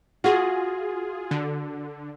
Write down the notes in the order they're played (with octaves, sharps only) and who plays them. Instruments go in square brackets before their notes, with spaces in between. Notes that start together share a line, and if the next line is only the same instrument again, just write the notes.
[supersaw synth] F4 G#4 [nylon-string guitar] F#4
[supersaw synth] D3